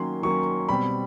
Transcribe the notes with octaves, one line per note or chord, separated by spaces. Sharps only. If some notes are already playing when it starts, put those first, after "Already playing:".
Already playing: D#3 F#3 A#3 C#4 C6
D#3 F#3 A#3 C#4 C#6
B2 G3 C4 B5